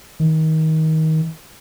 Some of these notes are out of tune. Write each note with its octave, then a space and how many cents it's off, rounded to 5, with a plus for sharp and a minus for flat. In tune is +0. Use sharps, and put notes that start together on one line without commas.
D#3 +25